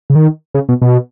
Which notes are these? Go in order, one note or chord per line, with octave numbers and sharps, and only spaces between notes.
C#3
D#3
C#3
B2
B2